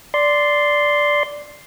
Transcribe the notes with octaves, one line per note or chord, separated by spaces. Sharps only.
D5 C6